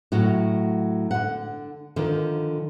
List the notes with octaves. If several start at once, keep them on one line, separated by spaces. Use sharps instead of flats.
A2 F#3 F#4
D3 F#5
D3 D#3 F3